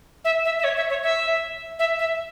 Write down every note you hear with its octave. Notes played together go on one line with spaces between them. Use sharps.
E5
E5
E5
C#5
E5
C#5
E5
E5
E5